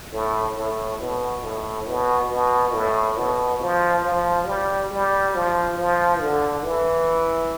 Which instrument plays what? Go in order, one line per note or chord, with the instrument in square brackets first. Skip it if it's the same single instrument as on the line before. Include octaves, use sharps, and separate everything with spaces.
[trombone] A2
A2
B2
A2
B2
B2
A2
B2
F3
F3
G3
G3
F3
F3
D3
E3